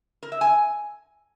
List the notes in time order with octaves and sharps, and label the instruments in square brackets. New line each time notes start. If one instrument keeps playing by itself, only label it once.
[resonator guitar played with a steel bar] A#4
E5
G#5